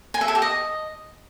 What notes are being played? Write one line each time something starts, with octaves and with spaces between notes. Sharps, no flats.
G#5
E5
A4
G4
D#5